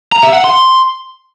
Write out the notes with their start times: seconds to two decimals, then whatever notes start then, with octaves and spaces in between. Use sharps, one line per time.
0.12 A#5
0.23 E5
0.34 F#5
0.44 C6